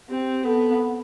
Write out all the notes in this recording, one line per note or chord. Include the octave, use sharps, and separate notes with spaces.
C4 G4
B3 A4